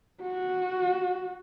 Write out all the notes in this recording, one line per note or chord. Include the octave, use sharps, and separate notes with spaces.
F#4